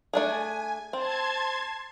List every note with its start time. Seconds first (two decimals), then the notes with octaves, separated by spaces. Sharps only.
0.13 A3 D4 G#4 G#5
0.93 C4 A5 C6 G#6